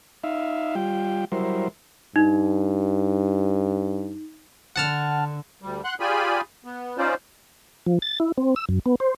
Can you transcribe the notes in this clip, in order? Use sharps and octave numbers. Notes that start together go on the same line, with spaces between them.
D#4 E5 F5
G3 F4 G5
F#3 G3 E4 A#4 C5
G2 D#4
D3 F#5 A5 F6
D2 G3
F#5 C6 F#6
F4 G4 G#4 D5 G#5 B5
B3
C#4 D#4 F4 C5 D5
F3
A6
E4
C4
E6
F#2
B3
C5